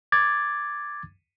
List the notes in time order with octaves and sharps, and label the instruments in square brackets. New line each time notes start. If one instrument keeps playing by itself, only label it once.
[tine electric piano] D6 G#6 A6